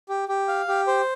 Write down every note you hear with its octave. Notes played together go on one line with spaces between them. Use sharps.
G4
G4
F5
G4
C5